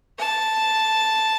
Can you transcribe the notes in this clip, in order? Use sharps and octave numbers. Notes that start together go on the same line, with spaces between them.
A5